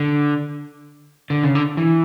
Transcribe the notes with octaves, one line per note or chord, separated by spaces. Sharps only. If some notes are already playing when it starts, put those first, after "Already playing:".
Already playing: D3
D3
C#3
D3
E3